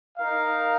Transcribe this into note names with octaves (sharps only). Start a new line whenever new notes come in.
D#4 A#4 F5